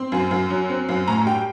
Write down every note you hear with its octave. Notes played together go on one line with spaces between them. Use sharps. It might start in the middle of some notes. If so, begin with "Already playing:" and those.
Already playing: C4 C6
F#2
F#2
F#3
C4
F#2
A2 A#5
G3 G5